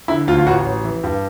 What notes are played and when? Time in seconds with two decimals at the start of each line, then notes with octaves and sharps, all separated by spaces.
0.08 D3 E4
0.27 D2 F4
0.38 F4
0.46 A1 F#4
0.66 A1
0.84 E3
1.03 G2